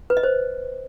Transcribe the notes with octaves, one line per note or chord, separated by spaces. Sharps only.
B4
D#5
C5